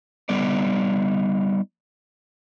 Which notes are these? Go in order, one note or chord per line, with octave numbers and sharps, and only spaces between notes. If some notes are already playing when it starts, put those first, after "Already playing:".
G3 B3 D#4 D5